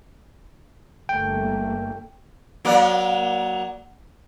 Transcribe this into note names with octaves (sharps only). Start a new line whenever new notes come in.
G1 A3 A#3 G5
F#3 A#3 D5